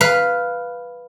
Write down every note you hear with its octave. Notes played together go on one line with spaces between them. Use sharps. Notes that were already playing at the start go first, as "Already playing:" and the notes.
B4 F5